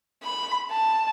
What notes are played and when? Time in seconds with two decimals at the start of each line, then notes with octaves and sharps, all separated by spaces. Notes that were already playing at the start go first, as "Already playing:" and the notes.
0.24 B5
0.71 A5